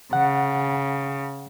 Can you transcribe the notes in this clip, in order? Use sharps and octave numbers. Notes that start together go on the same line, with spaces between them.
C#3 F#5